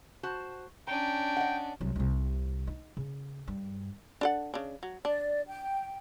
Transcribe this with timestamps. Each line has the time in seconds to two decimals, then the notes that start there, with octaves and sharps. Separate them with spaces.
0.23 F#4 C5 A5
0.87 C#4 D4 G5 A#5
1.37 D#5 F#5
1.81 C2 F#3
1.96 C2 C3
2.67 D#4
2.97 C#3
3.48 G2
4.21 D4 A4 F#5
4.54 C#3 D4
4.83 F#3
5.05 D4 D5
5.46 G5